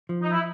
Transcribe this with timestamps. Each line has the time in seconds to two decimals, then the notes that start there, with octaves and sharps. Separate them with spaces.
0.09 F3
0.22 D#4
0.31 E4